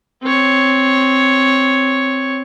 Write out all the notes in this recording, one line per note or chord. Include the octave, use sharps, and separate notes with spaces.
C4 C#5